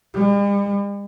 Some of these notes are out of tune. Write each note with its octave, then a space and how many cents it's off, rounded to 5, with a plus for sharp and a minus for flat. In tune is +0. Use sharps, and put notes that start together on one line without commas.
G3 +45